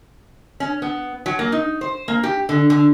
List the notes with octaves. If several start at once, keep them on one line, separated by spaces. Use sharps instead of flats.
C#4
B3
F#3
A#3
D#4
C5
A#3
G4
D3
D3